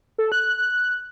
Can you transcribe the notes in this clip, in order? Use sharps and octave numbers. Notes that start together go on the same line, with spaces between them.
A4
F#6
F#6